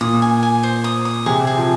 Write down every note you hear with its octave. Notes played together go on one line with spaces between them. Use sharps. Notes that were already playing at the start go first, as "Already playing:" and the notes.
A#2 D#6
G#5
G#5
C5
D#6
D#6
C3 G#4
G#4
F3